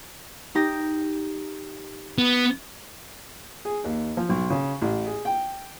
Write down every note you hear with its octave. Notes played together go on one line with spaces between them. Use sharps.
D#4 G4 A#6
B3
G#4
D#2
F3
B1
C#3
A1
G#4
G5